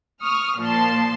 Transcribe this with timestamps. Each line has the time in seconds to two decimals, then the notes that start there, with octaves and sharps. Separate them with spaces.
0.22 C#6 D#6 F6
0.59 A#2 F3 A5 C6